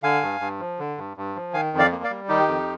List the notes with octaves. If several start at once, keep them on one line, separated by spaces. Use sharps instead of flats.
D3 F5 G#5
G2
G2
F3
D3
G2
G2
F3
D#3 F5 G#5
F2
D5 F5
A#3
D5 F5
G3
D#3 D#4 G4
F2